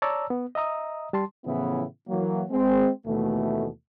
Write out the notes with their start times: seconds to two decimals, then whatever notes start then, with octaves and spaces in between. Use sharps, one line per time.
0.02 C#5 D5 A5 A#5 E6
0.30 B3
0.55 D#5 E5 A#5 D#6
1.13 G3 A5 C6
1.45 A2 C#3 E3 F3 B3 E4
2.08 E3 F#3 A#3
2.50 G#3 C4
3.06 D#2 B2 E3 A3